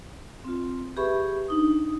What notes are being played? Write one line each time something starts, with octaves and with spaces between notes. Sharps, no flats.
C4 F4
G4 G#4 B4 E5 B5 C#6
D4 D#4 D#6